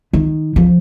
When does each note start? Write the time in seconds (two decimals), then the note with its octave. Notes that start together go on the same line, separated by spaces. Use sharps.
0.13 D#3
0.56 F3